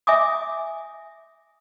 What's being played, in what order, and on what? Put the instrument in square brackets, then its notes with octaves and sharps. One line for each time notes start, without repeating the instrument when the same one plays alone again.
[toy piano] E5 G#5 D6 D#6